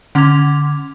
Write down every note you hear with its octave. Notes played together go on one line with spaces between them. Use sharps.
D3 C#4 C6 D6 G#6 F7